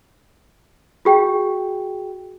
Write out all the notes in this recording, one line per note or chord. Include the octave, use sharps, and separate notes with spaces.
F#4 G#4 G5